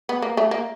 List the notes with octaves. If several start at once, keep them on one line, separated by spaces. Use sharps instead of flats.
B3
A#3
A3
A#3